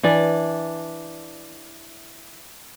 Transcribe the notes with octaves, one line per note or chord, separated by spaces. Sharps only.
E3 D4 D5